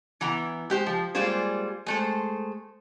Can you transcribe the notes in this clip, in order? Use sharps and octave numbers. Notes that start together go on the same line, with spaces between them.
E3 B3 A#5
G#3 G4 C5
F3
G3 G#3 A#3 F4 G#4 C5
G#3 A3 C5